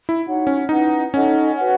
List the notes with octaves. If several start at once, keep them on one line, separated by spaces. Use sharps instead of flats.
E4
D#4 F#4 C#5 F#5
C#4
C#4 D#4 E4 B4 F#5
C#4 D#4 A4 D#5 F#5
F#4 B4 F#5